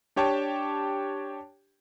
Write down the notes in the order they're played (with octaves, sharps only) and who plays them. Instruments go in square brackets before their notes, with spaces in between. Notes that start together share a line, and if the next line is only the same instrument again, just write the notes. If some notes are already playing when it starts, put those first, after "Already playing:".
[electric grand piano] D4 G4 C#5 G5 A5 D6